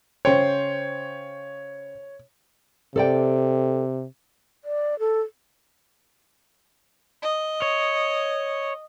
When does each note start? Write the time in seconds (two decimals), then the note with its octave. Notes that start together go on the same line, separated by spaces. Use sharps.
0.25 C#3 C5 C#5 G5
2.96 C3 A4 D5 G5
4.64 D5
4.99 A4
7.22 D#5
7.62 C#5